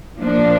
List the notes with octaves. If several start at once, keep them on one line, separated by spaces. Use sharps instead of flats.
A#2 F3 A#3 D4